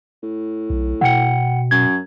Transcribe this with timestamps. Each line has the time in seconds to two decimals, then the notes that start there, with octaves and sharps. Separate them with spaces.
0.23 A2
0.70 B1
1.01 B2 F#5 G5 C#7
1.71 F#2 G#6